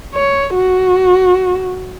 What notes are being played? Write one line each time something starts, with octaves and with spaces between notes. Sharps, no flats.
C#5
F#4